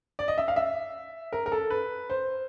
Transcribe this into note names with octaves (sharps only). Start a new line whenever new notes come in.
D5
D#5
E5
F5
E5
A#4
A#4
A4
B4
C5